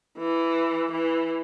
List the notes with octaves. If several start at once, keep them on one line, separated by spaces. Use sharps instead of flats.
E3
E3